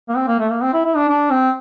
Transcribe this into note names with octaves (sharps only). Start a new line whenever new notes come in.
A#3
C4
A#3
A3
A#3
C4
E4
E4
D4
D4
C4